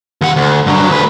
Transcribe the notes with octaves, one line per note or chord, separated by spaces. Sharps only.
D#2 F#5
D2
G2 F#3
D2 B4